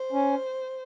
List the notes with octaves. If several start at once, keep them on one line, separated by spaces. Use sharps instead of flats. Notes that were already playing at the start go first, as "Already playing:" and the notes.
Already playing: C5
C#4